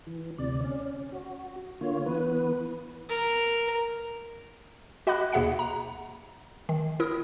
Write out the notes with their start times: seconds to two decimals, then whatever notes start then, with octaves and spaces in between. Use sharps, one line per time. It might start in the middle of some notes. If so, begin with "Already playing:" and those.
0.07 E3
0.38 D2 C3 D5
0.64 C#4
1.12 F#4
1.81 D3 A#3 F4 C#5
2.06 E3 B3 B4
3.09 A#4
5.07 F#4 D#5 F#5 B5 D6 F#6
5.33 D#2 B2 G#4 E5 F#5 C#7
5.59 A#5
6.69 D#3
7.00 E4 A#4 D#6